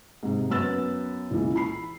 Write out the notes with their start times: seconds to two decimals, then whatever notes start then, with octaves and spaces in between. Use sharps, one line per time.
0.23 G#2 C3
0.50 F#2 B3 B4 E6 A6
1.31 C#2 A#2 E3
1.56 B5 C7